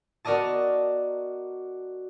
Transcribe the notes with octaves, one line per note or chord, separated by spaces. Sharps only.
B3 F#4 A#4 D5 D#5 A5